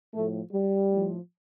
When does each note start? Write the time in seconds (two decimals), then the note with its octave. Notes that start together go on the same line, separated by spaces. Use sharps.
0.14 A2 F3 A3
0.52 G3
0.90 A2 F3